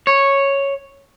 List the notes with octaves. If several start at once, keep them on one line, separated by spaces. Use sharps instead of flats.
C#5